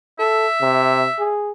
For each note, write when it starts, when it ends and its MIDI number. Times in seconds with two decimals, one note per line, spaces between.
0.19 0.46 69
0.19 1.32 76
0.61 1.07 48
1.19 1.52 68